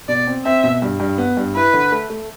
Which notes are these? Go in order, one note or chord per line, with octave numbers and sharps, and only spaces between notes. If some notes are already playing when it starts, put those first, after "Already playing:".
B2 D5
C4
C4 E5
B2
G2
G2
B3
G2
E4 B4
D3
A3
A3